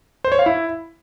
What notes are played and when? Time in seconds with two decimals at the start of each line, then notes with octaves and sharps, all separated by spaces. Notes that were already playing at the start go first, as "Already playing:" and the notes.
0.25 C5
0.32 C#5
0.39 F5
0.46 E4